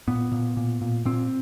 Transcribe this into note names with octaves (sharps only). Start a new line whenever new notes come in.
A#2 B3
A#2
A#2
A#2
A#2 C4